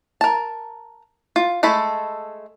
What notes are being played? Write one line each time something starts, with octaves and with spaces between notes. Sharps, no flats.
A#4 A5
F4
G#3 A3 A4 B5